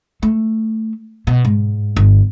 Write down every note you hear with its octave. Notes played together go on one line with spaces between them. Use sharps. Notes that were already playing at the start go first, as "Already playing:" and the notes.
A3
B2
G#2
G1